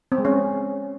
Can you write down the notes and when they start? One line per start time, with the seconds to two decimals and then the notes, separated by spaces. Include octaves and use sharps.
0.12 C4
0.18 G#3
0.25 C#4